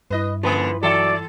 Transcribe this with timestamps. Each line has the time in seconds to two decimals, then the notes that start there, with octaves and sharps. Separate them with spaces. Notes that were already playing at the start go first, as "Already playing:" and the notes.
0.10 G2 E4 B4 D#5
0.43 D3 F3 A#3 B4
0.83 E3 F#3 A4 D5 E5